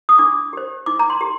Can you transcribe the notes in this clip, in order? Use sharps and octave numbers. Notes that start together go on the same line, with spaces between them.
D#6
D4 D6
G4 C5
D#4 D6
A#5
C6
G4